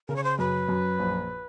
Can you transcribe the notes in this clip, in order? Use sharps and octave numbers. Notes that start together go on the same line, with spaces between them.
C#3 A#4
C#5
C5
F#2 B4
F#2
A#1